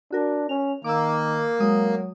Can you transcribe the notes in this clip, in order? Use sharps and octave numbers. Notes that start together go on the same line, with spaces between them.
D4 F#4 A#4
C#4 F7
D#3 A#3 D6 E6
F#3 G#3 D#6